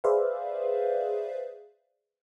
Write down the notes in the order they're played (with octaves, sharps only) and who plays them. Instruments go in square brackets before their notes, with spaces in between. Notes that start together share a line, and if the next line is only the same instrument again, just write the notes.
[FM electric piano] G#4 B4 C5 D5 E5 F5